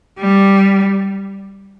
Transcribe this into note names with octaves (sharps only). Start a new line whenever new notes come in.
G3